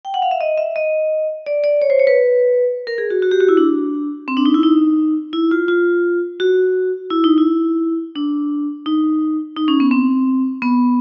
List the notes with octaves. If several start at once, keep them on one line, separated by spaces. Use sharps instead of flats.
G5
F#5
F5
E5
D#5
E5
D#5
D5
D5
C#5
C5
C#5
B4
A#4
G#4
F#4
F#4
G4
F#4
E4
D4
C4
D4
D#4
E4
D#4
E4
F4
F4
F#4
E4
D#4
E4
D4
D#4
D#4
C#4
B3
C4
B3